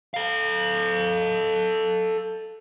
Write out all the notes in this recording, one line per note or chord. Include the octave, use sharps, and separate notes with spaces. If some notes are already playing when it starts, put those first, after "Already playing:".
A4 F5